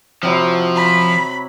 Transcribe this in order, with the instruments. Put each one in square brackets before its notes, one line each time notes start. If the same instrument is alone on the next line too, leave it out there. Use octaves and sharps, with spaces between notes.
[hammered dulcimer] C3 F#3 E4 [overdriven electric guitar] F3
[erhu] B5